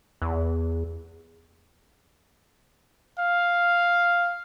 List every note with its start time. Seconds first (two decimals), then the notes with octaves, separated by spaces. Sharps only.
0.22 E2
3.20 F5